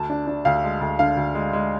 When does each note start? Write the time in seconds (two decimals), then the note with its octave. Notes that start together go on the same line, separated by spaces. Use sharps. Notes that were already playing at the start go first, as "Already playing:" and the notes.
Already playing: D2 A5
0.10 D4
0.27 D4
0.45 D2 F5
0.63 G#3
0.81 D2
0.99 D3 F5
1.17 D2
1.35 G#3
1.53 G#3